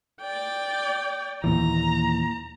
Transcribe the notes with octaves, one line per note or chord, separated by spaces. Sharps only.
D5 G5
D#2 A#2 E3 A#5